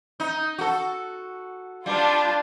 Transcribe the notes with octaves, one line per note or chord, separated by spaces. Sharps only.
D#4
F#4 A4
G3 D4 F4